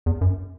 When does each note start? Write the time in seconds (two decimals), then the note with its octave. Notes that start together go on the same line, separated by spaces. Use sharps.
0.06 E2
0.21 F#2